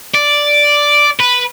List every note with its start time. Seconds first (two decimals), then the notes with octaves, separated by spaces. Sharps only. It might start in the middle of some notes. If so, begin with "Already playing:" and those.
0.15 D5
1.20 B4